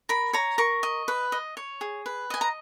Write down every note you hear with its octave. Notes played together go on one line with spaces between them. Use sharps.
A#4 B5
C#5 A#5
A#4 C#6
D#5
B4
D#5
C#5
G#4
B4
D#5 G#5
A#5